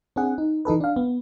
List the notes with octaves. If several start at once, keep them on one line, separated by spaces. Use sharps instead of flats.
C4 D4 G#4 F#5
D#4
E3 D#4 A4 B4
D4 F5
B3